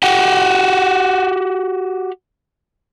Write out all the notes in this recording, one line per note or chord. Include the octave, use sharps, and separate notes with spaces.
F#4 G4 F#5 G5